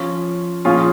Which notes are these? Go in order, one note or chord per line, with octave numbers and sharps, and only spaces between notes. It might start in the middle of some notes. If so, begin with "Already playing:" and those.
Already playing: F3 C#4 F4
A#2 F3 C#4 F4 G#4